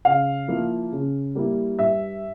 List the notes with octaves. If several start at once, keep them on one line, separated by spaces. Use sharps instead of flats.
C#3 F5
F3 A#3 E4
C#3
G3 A#3 E4
G2 E5